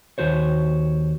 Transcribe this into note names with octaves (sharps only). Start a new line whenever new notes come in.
D#2 F#4 C5 C#5